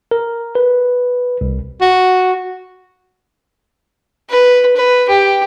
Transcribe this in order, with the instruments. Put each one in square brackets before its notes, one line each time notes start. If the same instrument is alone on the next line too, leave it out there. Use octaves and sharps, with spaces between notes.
[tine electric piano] A#4
B4
C2
[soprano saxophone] F#4
[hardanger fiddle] B4
B4
G4